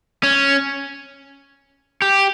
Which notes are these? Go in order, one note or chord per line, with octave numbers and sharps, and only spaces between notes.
C#4
G4